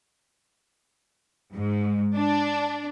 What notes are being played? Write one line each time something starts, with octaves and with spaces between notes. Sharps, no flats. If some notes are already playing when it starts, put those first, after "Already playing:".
G#2
D4